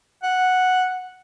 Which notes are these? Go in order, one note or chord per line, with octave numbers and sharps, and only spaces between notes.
F#5